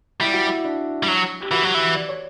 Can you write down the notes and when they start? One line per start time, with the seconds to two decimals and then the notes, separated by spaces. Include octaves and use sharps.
0.20 G3 E4
0.33 F#4
0.46 E4
0.64 D4
1.03 G3
1.08 F#3
1.41 G4
1.51 E3 F#4
1.63 F#3
1.75 E3
1.94 D5
2.09 C#5